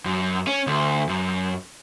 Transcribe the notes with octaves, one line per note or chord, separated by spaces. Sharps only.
F#2
C#4
D2
F#2